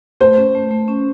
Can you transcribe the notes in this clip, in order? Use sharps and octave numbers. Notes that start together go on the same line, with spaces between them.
A3 C5
C#4
A3
A3
C#4